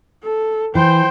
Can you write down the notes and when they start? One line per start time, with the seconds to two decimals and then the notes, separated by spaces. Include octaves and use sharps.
0.23 A4
0.75 E3 C5 G5